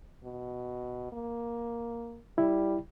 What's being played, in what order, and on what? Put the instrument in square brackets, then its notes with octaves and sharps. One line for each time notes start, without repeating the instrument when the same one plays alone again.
[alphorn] B2
A#3
[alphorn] G3 [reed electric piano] E4